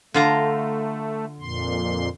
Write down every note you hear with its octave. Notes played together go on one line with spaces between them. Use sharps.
D3 A3 F4 A#5
F2 A#2 C6